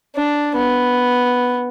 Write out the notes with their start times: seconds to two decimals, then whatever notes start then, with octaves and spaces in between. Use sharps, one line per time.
0.16 D4
0.56 B3